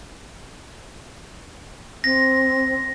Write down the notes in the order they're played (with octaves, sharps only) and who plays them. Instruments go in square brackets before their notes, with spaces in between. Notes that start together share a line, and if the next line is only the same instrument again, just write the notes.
[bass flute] C4 [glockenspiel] A#6